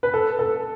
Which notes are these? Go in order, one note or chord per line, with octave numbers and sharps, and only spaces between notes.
B4
A4
A4